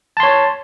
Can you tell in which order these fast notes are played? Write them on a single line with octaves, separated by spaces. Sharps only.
A5 C6 C#5